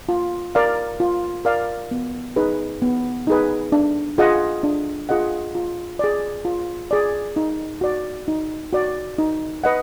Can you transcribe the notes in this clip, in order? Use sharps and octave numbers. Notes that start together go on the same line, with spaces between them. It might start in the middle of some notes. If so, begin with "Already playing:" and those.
F4
A#4 D5 F5
F4
A#4 D5 F5
B3
D#4 G#4 B4
B3
D#4 G#4 B4
D4
F4 G#4 D#5 F#5
D4
F4 G#4 D#5 F#5
F4
G#4 D5
F4
G#4 D5
D#4
F#4 D5
D#4
F#4 D5
D#4
B4 D#5 F#5